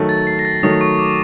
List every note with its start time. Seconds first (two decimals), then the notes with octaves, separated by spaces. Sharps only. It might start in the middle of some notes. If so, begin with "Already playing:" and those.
Already playing: D#3 F#3 A3
0.09 A6
0.27 C7
0.39 A#6
0.45 A6
0.63 D#3 F#3 A3 D#6
0.81 C#6
0.99 D6